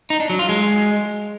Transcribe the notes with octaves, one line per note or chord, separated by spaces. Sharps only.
D#4
D4
F#3
F4
G#3